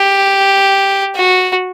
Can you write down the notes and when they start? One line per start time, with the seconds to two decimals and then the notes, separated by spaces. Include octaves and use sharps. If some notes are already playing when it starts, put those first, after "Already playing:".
Already playing: G4
1.16 F#4